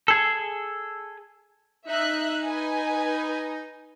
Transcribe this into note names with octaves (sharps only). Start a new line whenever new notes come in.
G#4 A4
D#4 E5 F#6
B4 G#5